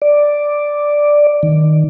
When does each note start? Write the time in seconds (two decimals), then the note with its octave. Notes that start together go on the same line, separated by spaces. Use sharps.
0.02 D5
1.43 D#3